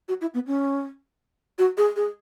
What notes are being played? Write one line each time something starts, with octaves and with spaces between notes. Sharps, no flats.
F#4
E4
B3
C#4
F#4
G#4
G#4